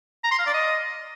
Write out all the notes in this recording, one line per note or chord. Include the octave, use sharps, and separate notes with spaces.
A#5
C6
F5
D5
D#5